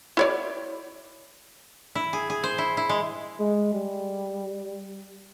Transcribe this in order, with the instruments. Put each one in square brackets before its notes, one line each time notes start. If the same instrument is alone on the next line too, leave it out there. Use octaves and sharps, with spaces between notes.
[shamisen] E4 C#5 D5
[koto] E4
G#4
G#4
C5
E4
E4
G#3
[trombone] G#3
G3